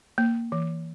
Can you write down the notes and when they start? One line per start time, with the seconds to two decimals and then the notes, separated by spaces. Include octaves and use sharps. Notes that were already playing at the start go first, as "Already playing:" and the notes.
0.18 A#3
0.52 E3